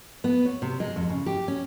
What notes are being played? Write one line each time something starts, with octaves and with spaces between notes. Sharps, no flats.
B3
C#5
C3
G#3
F2
C#3
G4
C#4